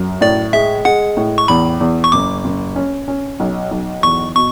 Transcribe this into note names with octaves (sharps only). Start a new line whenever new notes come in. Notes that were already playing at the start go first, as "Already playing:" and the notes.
Already playing: F#2
A2 D5
G#3 E5
G#3 F#5
A2
C#6
E2 B5
E2
C#6
F#1 D6
F#1
C#4
C#4
B1
B1
E2 C#6
B2 C#6